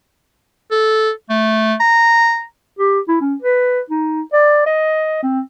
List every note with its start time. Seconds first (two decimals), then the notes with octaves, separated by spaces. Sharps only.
0.71 A4
1.30 A3
1.80 A#5
2.79 G4
3.08 E4
3.21 C#4
3.42 B4
3.90 D#4
4.33 D5
4.66 D#5
5.23 C4